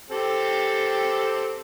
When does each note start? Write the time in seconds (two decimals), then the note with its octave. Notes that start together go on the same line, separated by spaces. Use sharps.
0.10 C4 G4 A4